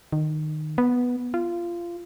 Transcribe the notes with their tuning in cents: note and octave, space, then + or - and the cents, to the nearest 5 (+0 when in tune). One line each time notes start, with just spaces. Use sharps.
D#3 -20
B3 -5
F4 -20